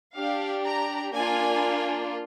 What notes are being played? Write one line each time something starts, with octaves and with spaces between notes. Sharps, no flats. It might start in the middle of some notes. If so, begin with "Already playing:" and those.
D4 G4 F5
A#5
A#3 D4 F4 G#5